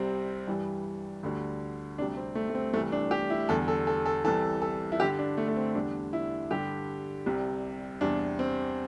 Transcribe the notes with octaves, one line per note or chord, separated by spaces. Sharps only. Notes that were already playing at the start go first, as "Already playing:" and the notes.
Already playing: C2 C3 G3 C4
G2 E3 G3
D2 D3 G3
D2 C3 G3 D4
C4
A3
A3
C4
C2 C3 E3 A3
D4
G4
E4
E2 D3 G3 A4
A4
A4
A4
C2 C3 E3 A4
A4
E4
G2 D3 G3 G4
D4
A3
A3
C4
E2 D3 G3 D4
E4
G2 D3 G3 G4
C2 C3 G3
E2 C3 G3 D4
C4